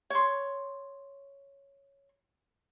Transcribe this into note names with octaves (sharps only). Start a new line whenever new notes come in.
C#5 C6